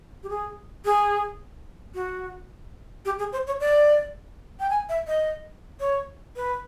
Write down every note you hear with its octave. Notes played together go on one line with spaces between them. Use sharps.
G4
G#4
G#4
F#4
G4
G#4
C5
C#5
D5
G5
G#5
E5
D#5
C#5
B4